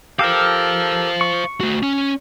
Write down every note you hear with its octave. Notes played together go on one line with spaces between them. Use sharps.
G4 A4 A#4 C5 F5
C#6
A3 F#4
C#4